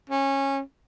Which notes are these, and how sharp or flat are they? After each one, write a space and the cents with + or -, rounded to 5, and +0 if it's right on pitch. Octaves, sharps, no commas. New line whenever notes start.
C#4 -20